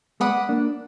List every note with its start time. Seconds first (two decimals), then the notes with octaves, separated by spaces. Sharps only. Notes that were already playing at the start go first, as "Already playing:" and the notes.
0.20 G#3 B3 D5 F#5 B5 D#6
0.49 A#3 D4